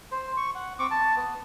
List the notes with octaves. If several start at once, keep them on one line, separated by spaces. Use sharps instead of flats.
C5
C#6
F#5
C4 C#6 D6
A5
B3